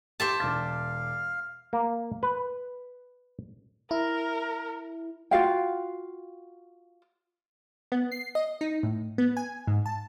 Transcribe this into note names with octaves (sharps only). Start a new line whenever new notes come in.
G4 C5 E5 A5 D6
E1 F5 D6 A6
A#3
B4
E4 A#4
F4 F#4 F5 G5
B3
C7
D#5
D#4
A2
B3
G#5
G#2
A5